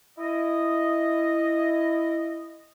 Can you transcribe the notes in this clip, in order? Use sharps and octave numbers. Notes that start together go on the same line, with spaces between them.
E4 D#5